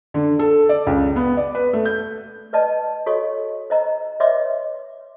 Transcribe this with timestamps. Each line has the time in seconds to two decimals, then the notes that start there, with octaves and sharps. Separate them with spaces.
0.14 D3
0.39 A4
0.69 D5
0.87 C#2
1.16 B3
1.37 D5
1.55 B4
1.73 A3
1.85 G6
2.53 B4 D5 D#5 A5
3.06 F#4 A4 C#5 D#5 C#6
3.70 C5 D#5 A#5
4.20 B4 C#5 D#5 E5 C6 D6